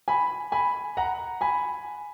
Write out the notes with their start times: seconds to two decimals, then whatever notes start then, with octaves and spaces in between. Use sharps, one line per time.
0.08 G#5 B5
0.52 G#5 B5
0.97 F#5 A#5
1.41 G#5 B5